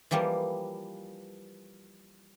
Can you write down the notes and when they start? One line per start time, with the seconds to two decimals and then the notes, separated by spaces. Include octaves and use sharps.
0.11 E3 F3 G3 A#3